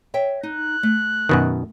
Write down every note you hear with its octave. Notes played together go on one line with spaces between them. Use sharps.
C#5 E5 G5
D#4 F#6
A3
F#2 B2 D#3